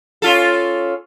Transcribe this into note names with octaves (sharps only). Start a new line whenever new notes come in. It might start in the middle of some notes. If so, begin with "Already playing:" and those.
C#4 F4 A4